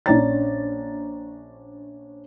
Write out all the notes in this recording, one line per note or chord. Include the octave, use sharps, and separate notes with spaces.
A#1 C#4 D4 C#5 A#5 A6